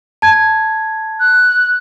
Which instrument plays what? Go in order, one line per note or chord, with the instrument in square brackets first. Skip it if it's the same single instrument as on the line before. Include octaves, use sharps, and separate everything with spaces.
[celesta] A5 G#6
[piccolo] F#6